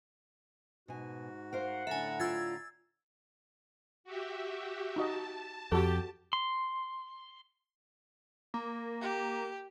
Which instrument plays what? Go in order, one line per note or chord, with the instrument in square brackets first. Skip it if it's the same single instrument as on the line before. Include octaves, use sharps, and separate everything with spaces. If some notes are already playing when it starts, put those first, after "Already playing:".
[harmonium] G#2 F#4 [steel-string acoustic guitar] B2 G#5
[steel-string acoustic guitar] A#4 C5 F5 [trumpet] F#5
[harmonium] A2 D3 A#5 [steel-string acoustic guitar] C#4 A4 [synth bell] E5 G#5
[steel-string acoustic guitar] F4 D5 [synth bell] E6 G#6 A6
[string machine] F#4 G4 E5
[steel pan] D#4 F#4 D#5 [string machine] A5
[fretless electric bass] F2 [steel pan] F#4 A4 [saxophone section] G4
[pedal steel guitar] C6
[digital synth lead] A#3
[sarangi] G4